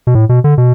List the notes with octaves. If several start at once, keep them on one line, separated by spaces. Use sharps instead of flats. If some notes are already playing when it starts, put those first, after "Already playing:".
B2
A2
B2
D3
B2